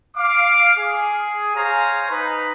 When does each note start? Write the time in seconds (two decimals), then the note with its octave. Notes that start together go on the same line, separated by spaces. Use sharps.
0.17 F5 D6
0.78 G#4
1.55 C5 C#5 F5 G#5 A#5
2.10 D#4 B4